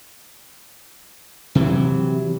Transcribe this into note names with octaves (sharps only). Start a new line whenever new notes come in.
C3 E3 F#3